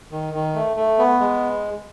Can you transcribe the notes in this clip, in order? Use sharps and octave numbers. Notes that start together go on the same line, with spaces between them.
D#3
D#3
A3
A3
B3
G#3